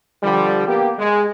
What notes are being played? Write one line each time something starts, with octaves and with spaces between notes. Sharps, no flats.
D3 F3 G3
A#3 B3 G4
G#3